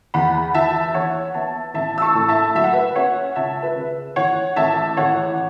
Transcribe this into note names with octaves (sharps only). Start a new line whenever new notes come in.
E2 F#5 B5
E3 E5 A5
E5
E3 C#5 F#5
B3 E5 A5
A1 E5 A5
E6
A5 C#6
A2
E5 A5
F#3 E5
F#5
B4 E5
C#4 C#5 F#5
C#2 E5 A5
B4 E5
C#3
E3 C#5 F#5
A1 E5 A5
A1 C#5 F#5